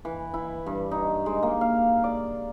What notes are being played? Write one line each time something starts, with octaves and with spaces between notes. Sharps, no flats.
E3
E4
G2
D#4
G#3
A#3
F5
D5